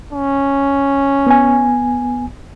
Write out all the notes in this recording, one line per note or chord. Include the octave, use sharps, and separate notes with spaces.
C#4
B3 G#5